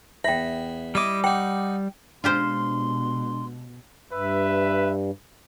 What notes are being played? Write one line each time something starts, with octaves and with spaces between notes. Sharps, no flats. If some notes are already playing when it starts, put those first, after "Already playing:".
E2 E5 G5 B5
G3 E4 D#5 D6
D#4 F#5 G5
B2 G#3 D4 F4 G4 C5 C6
G2 B4 E5